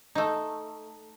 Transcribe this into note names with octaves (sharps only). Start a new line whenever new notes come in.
A3 D#4